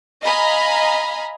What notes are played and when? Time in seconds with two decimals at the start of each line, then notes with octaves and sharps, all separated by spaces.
0.22 D#5 F5 G#5 A#5 B5